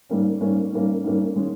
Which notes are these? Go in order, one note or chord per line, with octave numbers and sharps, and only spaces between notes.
G#2 G3 A#3 C#4
G#2 G3 A#3 C#4
G#2 G3 A#3 C#4
G#2 G3 A#3 C#4
D#3 G#3 C#4